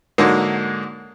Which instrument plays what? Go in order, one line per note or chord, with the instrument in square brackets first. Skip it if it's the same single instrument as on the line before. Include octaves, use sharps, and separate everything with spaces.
[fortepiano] G#2 D3 F#3 G#3 A#3